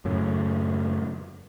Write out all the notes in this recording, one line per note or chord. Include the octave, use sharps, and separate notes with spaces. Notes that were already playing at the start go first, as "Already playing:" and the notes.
F#2 A2 C#3